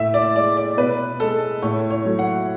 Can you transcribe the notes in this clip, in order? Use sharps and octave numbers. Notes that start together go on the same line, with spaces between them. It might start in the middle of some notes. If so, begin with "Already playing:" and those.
Already playing: A2 E5
D5
G#3 D5
D5
B2 B4
G#3 A4
A2 C#5
C#5
F#3 A3
F#5